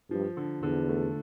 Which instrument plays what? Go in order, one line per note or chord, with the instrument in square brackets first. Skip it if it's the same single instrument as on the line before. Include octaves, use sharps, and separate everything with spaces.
[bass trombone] G2 [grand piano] F3
[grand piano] D3
[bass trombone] E2 [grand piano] D3
[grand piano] A3